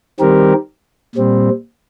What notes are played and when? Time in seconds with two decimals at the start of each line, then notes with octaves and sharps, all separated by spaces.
0.20 D#3 G3 C4 G4 A#4
1.16 A#2 G3 C4